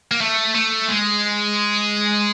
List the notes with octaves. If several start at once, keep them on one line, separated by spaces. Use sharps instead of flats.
A#3
A3
A3
G#3